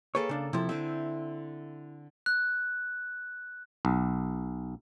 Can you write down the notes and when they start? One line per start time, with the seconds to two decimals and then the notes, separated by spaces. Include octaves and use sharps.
0.15 A#3 G#4 A4 B4 C#5
0.29 C#3 D4
0.53 C3 F3 E4 A4
0.69 D3 C4 E5
2.26 F#6
3.85 B1